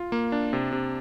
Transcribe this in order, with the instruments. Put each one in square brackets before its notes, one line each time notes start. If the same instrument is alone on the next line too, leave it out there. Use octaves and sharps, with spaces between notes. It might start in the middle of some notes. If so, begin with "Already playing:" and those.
Already playing: [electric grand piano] F4
A#3
D4
C3
C3